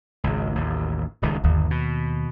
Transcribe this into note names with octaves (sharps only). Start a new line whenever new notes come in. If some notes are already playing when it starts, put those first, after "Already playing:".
G#1 C#2
A1 D#2
D#1 C#2 D#3
G1 D#2
B2